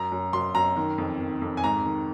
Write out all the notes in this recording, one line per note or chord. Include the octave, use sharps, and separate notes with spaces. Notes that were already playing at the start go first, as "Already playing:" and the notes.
Already playing: F#2 A#5
F#2
F#2 C6
F#2 A#5
D#3
F2
D#3
F2
G#5
G#2 A#5
D#3